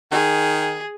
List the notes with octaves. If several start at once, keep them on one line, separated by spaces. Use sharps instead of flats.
D#3 G#4